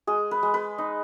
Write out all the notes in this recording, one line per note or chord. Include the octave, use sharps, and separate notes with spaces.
G#3 G#4
B4
G#3
B4
D#4